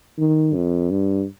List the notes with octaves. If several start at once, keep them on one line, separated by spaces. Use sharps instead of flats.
D#3
F2
G2